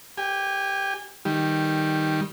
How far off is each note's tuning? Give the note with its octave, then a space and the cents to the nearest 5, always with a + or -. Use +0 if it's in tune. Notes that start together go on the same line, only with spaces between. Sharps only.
G4 +0 G#5 -25
D#3 +0 G3 +0